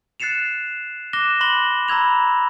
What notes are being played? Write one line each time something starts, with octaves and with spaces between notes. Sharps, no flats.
F#6 A6 C7 C#7 E7 F7
D6 F#6 A#6 E7 G7
B5 C6 F#6 A#6 F#7 G7
A#5 B5 E6 G#6 F7